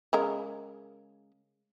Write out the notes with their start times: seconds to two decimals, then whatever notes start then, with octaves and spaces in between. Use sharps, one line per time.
0.13 C#3 G#3 A#4